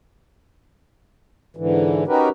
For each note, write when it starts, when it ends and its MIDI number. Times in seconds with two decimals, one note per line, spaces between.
1.57 2.04 44
1.57 2.04 50
1.57 2.04 52
2.08 2.29 61
2.08 2.29 63
2.08 2.29 66
2.08 2.29 67
2.08 2.29 70
2.08 2.29 71